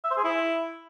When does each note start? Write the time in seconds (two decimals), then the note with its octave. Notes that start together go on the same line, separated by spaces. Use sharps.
0.04 E5
0.11 C5
0.17 G#4
0.24 E4